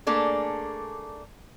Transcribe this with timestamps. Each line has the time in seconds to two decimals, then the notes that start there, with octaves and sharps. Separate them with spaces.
0.07 A3 A#3 D4 G#4 A4